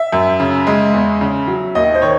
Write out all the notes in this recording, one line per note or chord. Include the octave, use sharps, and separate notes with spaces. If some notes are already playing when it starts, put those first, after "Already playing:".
Already playing: E5
F#2
C#3
G#3
E2
C#3
F#3
D#2 D#5
C5
D#3 C#5